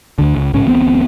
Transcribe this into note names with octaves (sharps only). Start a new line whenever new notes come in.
D2 D3
C#2
A#1 G#2 C#3 C#4
D1 A1 B3 C4